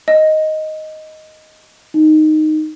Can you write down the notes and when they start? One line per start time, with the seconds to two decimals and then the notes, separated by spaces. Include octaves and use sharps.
0.08 D#5
1.94 D#4